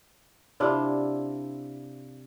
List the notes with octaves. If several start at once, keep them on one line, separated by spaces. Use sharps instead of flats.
C3 D4 E4 F4